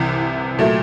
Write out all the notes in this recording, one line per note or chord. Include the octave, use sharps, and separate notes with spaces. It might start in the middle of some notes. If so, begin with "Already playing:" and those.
Already playing: C2 C3 E3
A#2 F#3 A3